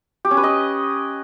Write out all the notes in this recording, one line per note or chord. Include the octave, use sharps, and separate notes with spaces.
G4
C#4
B4
D#5